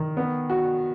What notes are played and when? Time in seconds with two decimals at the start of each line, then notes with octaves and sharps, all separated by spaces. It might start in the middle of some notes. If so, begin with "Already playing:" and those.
Already playing: D#3
0.17 B3
0.50 F#4